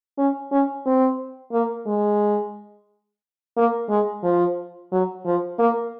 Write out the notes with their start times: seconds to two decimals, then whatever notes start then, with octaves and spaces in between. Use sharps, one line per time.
0.18 C#4
0.52 C#4
0.85 C4
1.52 A#3
1.86 G#3
3.56 A#3
3.89 G#3
4.23 F3
4.92 F#3
5.25 F3
5.59 A#3